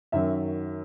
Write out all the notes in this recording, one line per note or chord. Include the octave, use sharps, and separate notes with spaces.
F#2 D#3 F#3 E5